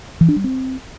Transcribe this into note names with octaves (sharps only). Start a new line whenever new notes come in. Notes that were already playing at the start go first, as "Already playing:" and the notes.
E3
D4
G3
C4